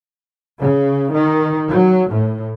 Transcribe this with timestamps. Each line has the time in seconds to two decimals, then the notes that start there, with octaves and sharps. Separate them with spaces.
0.60 C#3
1.13 D#3
1.69 F#3
2.10 A2